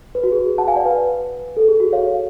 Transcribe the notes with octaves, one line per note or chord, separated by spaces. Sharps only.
B4
F#4
G#4
F#5 A5
F5 G#5
D5 F#5
B4
A4
G#4
F#4
C#5 F5